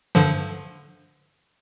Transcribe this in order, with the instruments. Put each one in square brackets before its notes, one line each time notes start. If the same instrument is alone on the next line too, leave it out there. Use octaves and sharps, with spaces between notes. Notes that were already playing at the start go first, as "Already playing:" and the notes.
[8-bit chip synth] G2 D3 F3